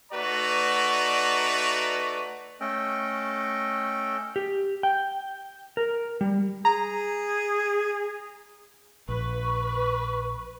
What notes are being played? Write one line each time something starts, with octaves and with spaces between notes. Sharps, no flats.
A3 D#4 F#4 B4 D5 A#5
A3 C#4 A4 D#5 G5
G4
G5
A#4
G3
G#4 A#5
A#1 B4 C#6